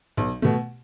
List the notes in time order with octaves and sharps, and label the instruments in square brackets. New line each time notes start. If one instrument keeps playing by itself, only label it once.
[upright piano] B1
B2 A3